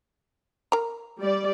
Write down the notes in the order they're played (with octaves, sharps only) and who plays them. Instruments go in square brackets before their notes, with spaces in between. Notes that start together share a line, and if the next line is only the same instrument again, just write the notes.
[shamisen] A#4 A#5
[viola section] G3 D5